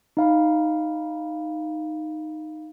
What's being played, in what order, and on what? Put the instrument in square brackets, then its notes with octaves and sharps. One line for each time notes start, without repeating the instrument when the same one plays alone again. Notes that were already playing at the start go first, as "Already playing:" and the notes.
[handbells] D#4 F5 B5